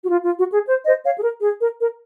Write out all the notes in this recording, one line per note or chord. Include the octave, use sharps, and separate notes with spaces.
F#4
F4
F4
F#4
G#4
C5
C5 D#5
C#5 F5
G#4
A#4
G#4
A#4
A#4